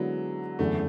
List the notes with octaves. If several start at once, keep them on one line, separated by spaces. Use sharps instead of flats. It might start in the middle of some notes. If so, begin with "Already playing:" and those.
Already playing: D3 F#3 G#3 B3 E4 G#4
F#1 E2 D3 A3